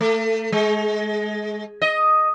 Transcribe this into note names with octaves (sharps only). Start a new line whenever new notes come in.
A3
G#3
D#5